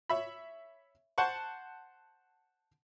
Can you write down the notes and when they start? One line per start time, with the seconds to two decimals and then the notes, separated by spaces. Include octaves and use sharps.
0.09 C#5 E5 B5
1.18 C5 F#5 A5 C#6